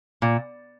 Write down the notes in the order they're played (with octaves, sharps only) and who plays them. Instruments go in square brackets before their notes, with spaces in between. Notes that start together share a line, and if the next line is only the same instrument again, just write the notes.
[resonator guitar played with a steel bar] A#2